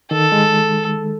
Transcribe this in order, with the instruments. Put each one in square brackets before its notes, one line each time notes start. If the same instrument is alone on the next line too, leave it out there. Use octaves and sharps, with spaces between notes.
[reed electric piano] D#3 [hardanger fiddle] A4
[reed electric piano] G#3